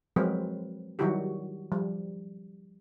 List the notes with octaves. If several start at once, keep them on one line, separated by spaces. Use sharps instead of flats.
F3 F#3 G#3 C4 A#4 B4
D#3 F#3 G3 E4 F#4 G4
F3 G3